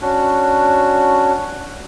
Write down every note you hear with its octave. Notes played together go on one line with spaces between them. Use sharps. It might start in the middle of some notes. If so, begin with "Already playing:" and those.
C#4 D4 F#4